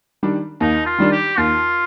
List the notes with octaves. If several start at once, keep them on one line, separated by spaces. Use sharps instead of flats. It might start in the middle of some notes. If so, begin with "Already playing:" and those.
D#3 G3 D4
D#2 D#4
F4
D#3 G3 D4
G4
D#2 F4